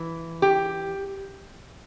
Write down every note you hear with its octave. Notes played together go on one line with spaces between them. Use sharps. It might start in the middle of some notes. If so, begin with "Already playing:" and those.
Already playing: E3
G4